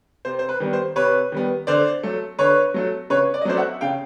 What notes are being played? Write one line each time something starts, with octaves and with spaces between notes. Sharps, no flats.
C3 C5
C5
B4
D#3 G3 B3
C5
C3 B4 C#5
D#3 G3 B3
D3 C5 D5
F#3 A3
D3 B4 C#5
F#3 A3
C#3 B4 C#5
D5
D#5
F#3 A3 C#4 C5 D5
E5 F#5
C#3 F5 G5